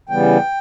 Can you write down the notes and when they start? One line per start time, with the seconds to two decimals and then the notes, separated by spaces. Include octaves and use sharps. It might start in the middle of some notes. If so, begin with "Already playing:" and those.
0.09 C#3 E3 G3 B3 G5